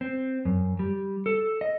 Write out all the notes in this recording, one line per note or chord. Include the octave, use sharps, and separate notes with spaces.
C4
F#2
G3
A4
D#5